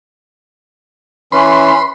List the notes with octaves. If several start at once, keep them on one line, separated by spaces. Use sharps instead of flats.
E3 C#4 B5 C6